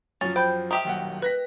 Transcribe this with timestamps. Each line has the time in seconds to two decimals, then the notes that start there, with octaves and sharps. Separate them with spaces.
0.21 F#2 F3 C#4 A6
0.36 C5 G5 B5 G6
0.71 D#3 G4 E5
0.85 D#1 B1 F#5
1.22 B4 F#6 A#6 B6